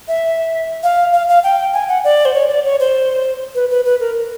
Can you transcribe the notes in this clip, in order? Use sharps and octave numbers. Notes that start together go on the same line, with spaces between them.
E5
F5
F5
F5
G5
G#5
F#5
D5
C5
C#5
D5
C#5
C5
B4
B4
B4
A#4